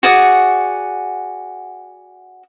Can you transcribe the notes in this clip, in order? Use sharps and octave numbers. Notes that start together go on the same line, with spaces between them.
F#4 G#4 D5 F#5